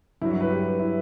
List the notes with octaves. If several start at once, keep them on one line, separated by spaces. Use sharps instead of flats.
G2 F#3 E4
F#4
B4
G4
E4